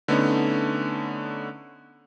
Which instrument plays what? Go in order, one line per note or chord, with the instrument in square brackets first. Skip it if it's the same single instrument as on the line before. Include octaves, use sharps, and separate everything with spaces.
[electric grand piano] D3 A3 B3 C#4 D#4